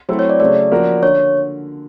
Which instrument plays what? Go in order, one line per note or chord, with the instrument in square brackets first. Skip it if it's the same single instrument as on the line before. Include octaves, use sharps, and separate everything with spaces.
[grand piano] F#3 A3 C4 E4 A4 [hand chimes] C5
[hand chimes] C#5
D5
[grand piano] C#3 F#3 A3 [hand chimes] D5
[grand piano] F3 A#3 C#4 F#4 A#4
[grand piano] D3 [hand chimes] C#5